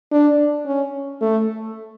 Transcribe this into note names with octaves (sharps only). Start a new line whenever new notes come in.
D4
C#4
A3